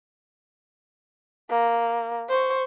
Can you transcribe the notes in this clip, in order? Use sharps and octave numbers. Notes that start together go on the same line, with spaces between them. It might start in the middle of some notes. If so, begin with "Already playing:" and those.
A#3
C5 C#6